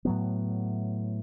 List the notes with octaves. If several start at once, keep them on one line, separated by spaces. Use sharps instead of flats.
A2 F#3 B3